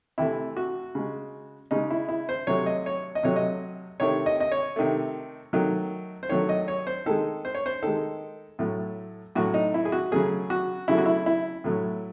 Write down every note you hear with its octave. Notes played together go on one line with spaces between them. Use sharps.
C3 E3 A3 E4
F#4
C#3 G#3
C#3 G#3 D#4
E4
E4
C5
C3 F#3 A3 C#5
D#5
C#5
D#5
C3 F#3 A3 C#5
D#5
C3 D#3 A3 C#5
D#5
D#5
C#5
C3 D#3 A3
D#3 F#3 A3
C5
D#3 F#3 A3 C#5
D#5
C#5
C5
D#3 G#3 A4
C5
C#5
C5
D#3 G#3 A4
A2 F#3 A3
A2 F#3 A3 F#4
D#4
E4
G#4
F#4
C#3 F#3 A3 G#4
F#4
C#3 F#3 A3 E4
F#4
E4
E4
A2 F#3 A3